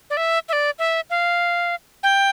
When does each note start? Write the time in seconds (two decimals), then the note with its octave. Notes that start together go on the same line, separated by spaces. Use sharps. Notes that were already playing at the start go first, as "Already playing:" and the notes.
0.10 D5
0.17 E5
0.49 E5
0.53 D5
0.79 E5
1.10 F5
2.03 G5